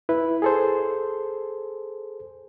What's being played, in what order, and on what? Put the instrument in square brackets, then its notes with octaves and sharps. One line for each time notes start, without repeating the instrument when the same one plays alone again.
[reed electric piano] E4 B4
G#4 A4 C5